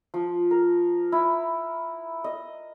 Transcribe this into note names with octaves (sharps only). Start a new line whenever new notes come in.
F3
A#4
E4
D#5